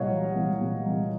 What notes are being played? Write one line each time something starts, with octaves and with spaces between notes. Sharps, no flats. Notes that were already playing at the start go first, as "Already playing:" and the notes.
Already playing: C2 A#2 C#5 D#5 F5 F#5
F#3
C2
A#2
C2